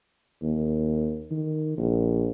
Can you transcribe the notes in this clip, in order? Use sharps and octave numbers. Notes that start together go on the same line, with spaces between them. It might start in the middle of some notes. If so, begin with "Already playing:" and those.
D#2
D#3
A#1